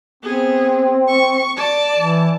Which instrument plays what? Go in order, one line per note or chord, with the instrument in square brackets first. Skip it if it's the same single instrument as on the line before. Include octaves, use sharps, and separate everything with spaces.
[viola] B3 G#4 [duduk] C4
[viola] C#6
D5 A5
[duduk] E3